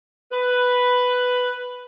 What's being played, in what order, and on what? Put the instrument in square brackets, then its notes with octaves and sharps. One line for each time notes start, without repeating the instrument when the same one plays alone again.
[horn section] B4